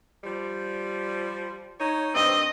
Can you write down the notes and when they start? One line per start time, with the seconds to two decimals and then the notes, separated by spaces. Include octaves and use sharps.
0.24 F3 G3
1.80 D#4 C#5
2.15 G2 C4 D#5